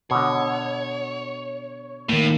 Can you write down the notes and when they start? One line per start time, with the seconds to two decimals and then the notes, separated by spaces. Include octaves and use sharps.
0.11 B2 D3 C#5
2.09 A2 D#3 A#3